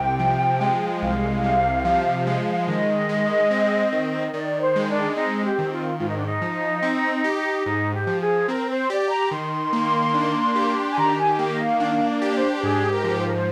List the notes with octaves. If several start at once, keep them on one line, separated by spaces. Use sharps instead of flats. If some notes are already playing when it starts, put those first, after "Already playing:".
Already playing: C2 C3 G5
F3
G#3
C2 F5
C3
F3
G#3
F5
D#3 D#5
G#3
C4
D#3
D#3 D5
C5
G#3
D4
C4 D#4
G4
D#3
F4
G#2 F4
D#4
D4
D#4
F3
C4
G4
G#2 D#4
G4
F3
G#4
C4 A#4
C5
G4 D5
A#5
D#3 C6
A#3
D4
G4
G#5
D#3 A#5
G#5
A#3 G5
D#5
F5
D4 F5
D5
G4
C5
G#2 G#4
A#4
F3
C5
A#4
C5